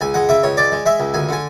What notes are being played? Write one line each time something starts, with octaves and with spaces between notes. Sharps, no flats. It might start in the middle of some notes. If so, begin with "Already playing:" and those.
C#2 G#5
G#3 F#5
C#3 E5
C#2 C#5
G#3 D5
G#3
G#3 E5
C#2
D2 G#5
D3 G#5